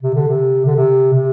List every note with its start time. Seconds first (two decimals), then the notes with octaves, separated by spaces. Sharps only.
0.02 C3
0.14 D3
0.27 C3
0.65 D3
0.76 C3
1.13 C3